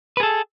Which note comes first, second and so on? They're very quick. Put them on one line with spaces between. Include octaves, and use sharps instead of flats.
B4 G#4 A4